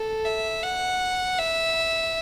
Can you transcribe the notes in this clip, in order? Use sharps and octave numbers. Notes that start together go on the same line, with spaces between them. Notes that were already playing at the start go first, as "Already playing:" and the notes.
Already playing: A4
E5
F#5
E5